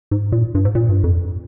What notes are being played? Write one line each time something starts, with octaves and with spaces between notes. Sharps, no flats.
G#2
A#2
G2
G#2
A#2
G2
F2